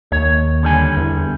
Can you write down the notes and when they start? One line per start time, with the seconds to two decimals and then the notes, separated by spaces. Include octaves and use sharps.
0.12 D#2 C#5
0.63 D3 G3 G#5
0.97 E2